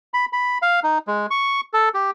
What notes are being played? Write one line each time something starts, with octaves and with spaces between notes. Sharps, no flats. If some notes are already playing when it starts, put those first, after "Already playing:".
B5
B5
F5
D#4
G#3
C#6
A4
G4